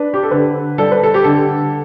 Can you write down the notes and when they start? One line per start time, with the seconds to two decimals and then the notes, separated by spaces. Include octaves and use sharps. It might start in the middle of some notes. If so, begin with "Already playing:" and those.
Already playing: D4 B4
0.14 G4
0.23 A4
0.31 D3 B4
0.78 G3 A4
0.91 B4
1.03 A4
1.14 G4
1.24 D3 A4